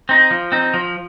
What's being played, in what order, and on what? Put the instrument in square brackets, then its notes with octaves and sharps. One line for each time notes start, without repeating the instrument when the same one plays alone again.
[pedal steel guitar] C4 D#4
F3
C4 D#4
F3